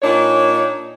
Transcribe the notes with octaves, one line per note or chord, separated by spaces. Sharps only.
A#2 D4 D#4 C#5